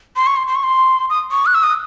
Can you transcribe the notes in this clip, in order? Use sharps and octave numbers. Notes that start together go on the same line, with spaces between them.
C6
C#6
C6
C6
C#6
C6
D#6
C#6
F#6
E6
D#6